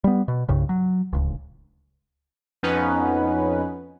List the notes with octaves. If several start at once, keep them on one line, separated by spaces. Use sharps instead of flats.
G3 B3
B2
C2 G2 C#3
F#3
D1 C#2
F2 B3 C#4 D#4 B4